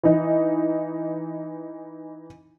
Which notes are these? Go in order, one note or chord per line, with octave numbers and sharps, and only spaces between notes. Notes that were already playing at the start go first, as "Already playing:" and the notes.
E3 D#4